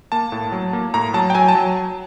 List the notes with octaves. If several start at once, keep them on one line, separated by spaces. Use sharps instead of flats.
A#3 A5
A2
F#3
A#3
A2 A#5
F#3 A5
G5
F#3 G#5
A5
F#3